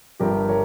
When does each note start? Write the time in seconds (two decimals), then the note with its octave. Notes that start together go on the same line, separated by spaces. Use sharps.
0.20 G1 G2 F3 G4 A#4
0.49 A#4 C#5